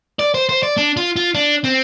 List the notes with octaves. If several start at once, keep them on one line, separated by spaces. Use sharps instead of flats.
D5
C5
C5
D5
D4
F4
F4
D4
C4